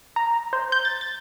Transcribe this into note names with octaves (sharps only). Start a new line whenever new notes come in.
A#5
C5
G6
A6
A6